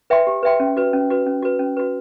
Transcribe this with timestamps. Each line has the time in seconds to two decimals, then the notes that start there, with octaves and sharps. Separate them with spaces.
0.10 B4 E5 G5 C6
0.27 G4
0.43 B4 E5 G5 C6
0.60 C#4
0.77 F#4 B4
0.93 C#4
1.10 F#4 B4
1.26 C#4
1.43 F#4 B4
1.59 C#4
1.77 F#4 B4